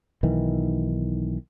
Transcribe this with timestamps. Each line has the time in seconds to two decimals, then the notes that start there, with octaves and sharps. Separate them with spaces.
0.23 B1 D#3 E3